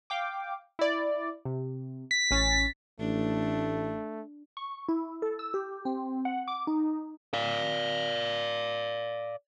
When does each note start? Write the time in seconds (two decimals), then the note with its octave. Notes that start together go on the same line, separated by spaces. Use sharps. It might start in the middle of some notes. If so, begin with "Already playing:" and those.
0.10 F5 G5 D6
0.79 E4 D5
1.45 C3
2.11 B6
2.31 A1 C#4 A6
3.00 A1 A3 D4
4.57 C#6
4.89 E4
5.22 A4
5.39 E6
5.54 G4
5.85 C4
6.25 F#5
6.48 D6
6.67 D#4
7.34 D5 F5